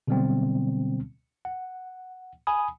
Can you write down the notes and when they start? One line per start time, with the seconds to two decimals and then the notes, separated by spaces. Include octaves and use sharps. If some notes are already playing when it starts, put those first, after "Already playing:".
0.07 B2 D3 F#3 G3 B3 C4
1.45 F#5
2.47 G#5 B5 D#6